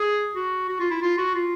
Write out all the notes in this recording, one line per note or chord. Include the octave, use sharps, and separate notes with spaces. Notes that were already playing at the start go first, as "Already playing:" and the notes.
Already playing: G#4
F#4
F#4
F4
E4
F4
F#4
F4